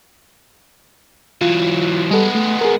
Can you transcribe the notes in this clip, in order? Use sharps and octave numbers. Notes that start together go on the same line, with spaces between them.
E3 F#3 F4
G3 G#3 B3 A4
A3
G#4 A#4